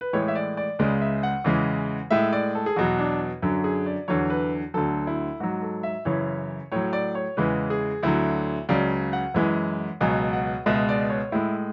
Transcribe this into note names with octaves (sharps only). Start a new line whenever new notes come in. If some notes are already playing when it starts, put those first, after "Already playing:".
B4
A2 E3 G#3 C#5
E5
D5
D5
C#2 C#3 G#3 D5
E5
F#5
E2 C#3 E3 G#3
A2 G#3 E5
D5
A4
G#4
E2 B2 F#3 F#4
D4
F#2 D3 F#3
G#4
D5
E2 D3 F#3 C#5
B4
D2 D3 F#3 A4
E4
G#2 F#3 F#4
A4
E5
F#2 C#3 E3 C#5
A2 F#3 C#5
D5
C#5
E2 C#3 E3 G#3 B4
G#4
D2 D3 F#3 E4
C#2 C#3 F#3 D5
F#5
F#2 E3 G#3
C#2 B2 F#3 G#5
F#5
C#2 B2 G#3 E5
D5
C#5
A2 G#3 E4